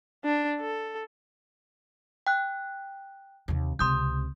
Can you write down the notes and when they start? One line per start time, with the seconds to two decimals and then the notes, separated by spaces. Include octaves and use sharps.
0.25 D4
0.61 A4
2.27 G5 F#6
3.48 D#2 C3
3.79 C#2 C3 C6 D#6 G6